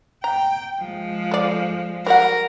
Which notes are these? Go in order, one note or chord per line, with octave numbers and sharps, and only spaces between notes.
G5 A#5
F3 G#3
A4 D5
F#3 G3 A#4 F#5